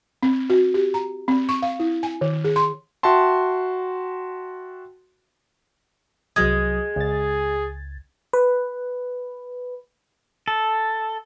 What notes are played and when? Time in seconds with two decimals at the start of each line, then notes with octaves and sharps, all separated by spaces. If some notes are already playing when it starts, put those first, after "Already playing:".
0.23 C4
0.50 F#4
0.74 G4
0.94 A#5
1.28 C4
1.49 C#6
1.62 F5
1.80 E4
2.03 G#5
2.21 D#3
2.44 G#4
2.56 C6
3.03 F#4 E5 G5 A5 C6
6.36 C2 F#3 G#3 D#6 G#6
6.96 C#2 G#4 A6
8.33 B4
10.48 A4